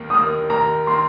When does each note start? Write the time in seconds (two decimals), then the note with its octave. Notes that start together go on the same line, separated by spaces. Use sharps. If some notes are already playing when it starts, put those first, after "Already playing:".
Already playing: D#2 D#3 A#3
0.10 D#2 D#3 A#3 D#6
0.50 D#2 D#3 A#3 A#5
0.87 D#3 A#3 C6